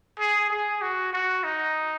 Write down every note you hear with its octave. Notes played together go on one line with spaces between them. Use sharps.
G#4
G#4
F#4
F#4
D#4